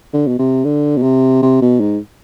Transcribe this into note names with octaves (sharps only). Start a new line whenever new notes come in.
D3
B2
C3
D3
B2
C3
C3
B2
G#2